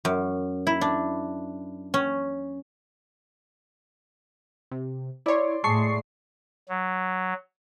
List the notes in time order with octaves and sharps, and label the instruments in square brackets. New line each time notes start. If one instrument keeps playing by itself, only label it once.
[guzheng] F#2
E4
D4
C#4
[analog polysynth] C3
[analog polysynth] E4 C#5 [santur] D5 C6
[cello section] A2 [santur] G#3 [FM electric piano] A5 C#6 [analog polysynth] C7
[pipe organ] F#3